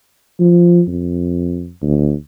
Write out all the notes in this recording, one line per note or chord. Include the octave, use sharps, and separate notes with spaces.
F3
F2
D2